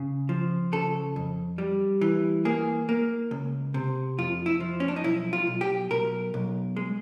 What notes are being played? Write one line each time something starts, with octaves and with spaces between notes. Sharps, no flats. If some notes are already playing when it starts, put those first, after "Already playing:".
Already playing: C#3
F3
C#3 A4
F2
G3
E3
A#3 G#4
A#3
C#2
C3
F2 F4
E4
F3
C#4
D4
D#4
B1 E4
F4
B1
G4
B1 A#4
B1
G#3